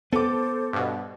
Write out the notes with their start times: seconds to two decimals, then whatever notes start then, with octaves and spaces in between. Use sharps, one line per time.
0.12 B3 A4 C5 D6
0.73 G2 B2